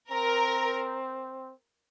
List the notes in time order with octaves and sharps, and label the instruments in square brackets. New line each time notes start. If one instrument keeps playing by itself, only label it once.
[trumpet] C4 [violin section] A#4